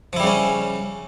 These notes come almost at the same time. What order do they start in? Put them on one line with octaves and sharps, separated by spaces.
F3 E4 G3 C#3 C#4